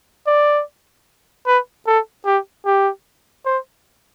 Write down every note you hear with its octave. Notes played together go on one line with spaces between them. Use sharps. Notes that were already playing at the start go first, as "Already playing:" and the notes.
D5
B4
A4
G4
G4
C5